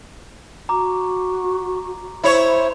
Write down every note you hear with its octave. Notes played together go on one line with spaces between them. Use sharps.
F#4 A#5 D6
E4 C5 C#5